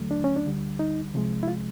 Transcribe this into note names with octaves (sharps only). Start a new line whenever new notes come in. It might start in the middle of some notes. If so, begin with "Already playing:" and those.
Already playing: D#2 D3 F#3 A3
D4
C#4
D4
D2 D3 G3
D#4
C2 C3 F3 G#3
E4
F4